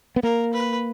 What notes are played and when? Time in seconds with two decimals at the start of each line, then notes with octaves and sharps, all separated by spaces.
0.16 B3
0.23 A#3 A#4
0.54 B4